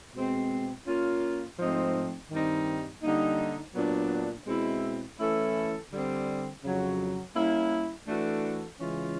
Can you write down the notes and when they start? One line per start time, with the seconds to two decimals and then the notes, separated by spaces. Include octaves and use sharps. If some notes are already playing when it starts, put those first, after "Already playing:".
0.15 B2 G#3 C4
0.86 A#3 C#4 F4
1.58 G#2 F3 A3 C4 D#4
2.30 G2 D#3 G3 C4 D#4
3.03 D3 G3 A#3 D#4
3.75 A#2 F#3 B3 D4
4.46 B2 G#3 C4 E4
5.19 E3 A3 C#4 E4 A4
5.91 D3 G3 C4
6.63 F2 C#3 F#3
7.35 G3 A#3 C#4 E4
8.07 E3 A3 D4 F#4 A4
8.79 C#3 E3 G#3 C#4 F4